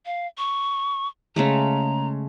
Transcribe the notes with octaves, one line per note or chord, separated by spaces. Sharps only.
F5
C#6
C#3 G#3 A3 A#5